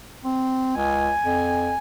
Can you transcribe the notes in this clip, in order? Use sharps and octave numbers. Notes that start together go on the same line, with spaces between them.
C4
C#2 G#5
F2